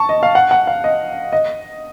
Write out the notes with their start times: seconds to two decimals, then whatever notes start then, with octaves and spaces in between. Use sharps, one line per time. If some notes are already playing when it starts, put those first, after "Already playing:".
Already playing: A5 C#6
0.09 D#5
0.23 F5
0.35 F#5
0.51 F#5
0.67 F5
0.84 D#5
1.32 D#5